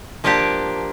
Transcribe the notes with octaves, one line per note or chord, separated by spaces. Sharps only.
F3 A#3 D4 G4